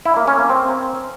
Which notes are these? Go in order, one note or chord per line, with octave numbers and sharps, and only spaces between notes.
E4
A#3
C#4
A#3
C4